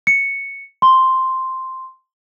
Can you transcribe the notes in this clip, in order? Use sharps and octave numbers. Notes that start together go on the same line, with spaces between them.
C#7
C6